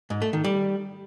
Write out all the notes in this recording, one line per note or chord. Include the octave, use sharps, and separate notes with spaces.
G#2
A3
D#3
G3